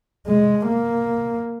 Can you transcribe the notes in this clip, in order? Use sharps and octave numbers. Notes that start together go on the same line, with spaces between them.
G#3
A#3